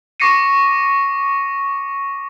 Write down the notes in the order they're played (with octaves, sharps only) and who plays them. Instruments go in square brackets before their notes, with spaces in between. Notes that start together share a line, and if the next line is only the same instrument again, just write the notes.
[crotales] C#6 D6 A#6 C7 C#7 D#7